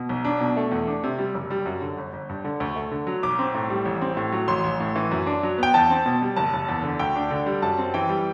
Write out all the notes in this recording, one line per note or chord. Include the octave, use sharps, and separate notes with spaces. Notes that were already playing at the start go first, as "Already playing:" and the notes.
Already playing: B2
B1
D4
B2
A3
E2
D4
C3
G3
F#1
G3
F#2
D3
G1
G1
G2
D3
D2
A3
D3
F#3
B1 D6
C4
A2
G3
A1
C4
A2
F#3
A1 C6
A1
A2
E3
F#2
D4
F#3
B3 G5
E2 A5
C4
B2
G3
F#1 A5
F#1
E2
D3
D2 G5
D4
D3
G3
F#2 A5
C4
E3 G5
G3